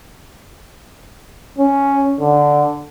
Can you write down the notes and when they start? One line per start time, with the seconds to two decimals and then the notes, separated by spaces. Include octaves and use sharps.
1.58 C#4
2.20 D3